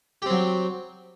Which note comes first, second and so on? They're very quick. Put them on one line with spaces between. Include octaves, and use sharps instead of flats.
G4 C4 F#3